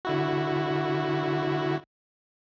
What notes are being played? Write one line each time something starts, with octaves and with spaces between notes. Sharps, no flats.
D3 E4 F#4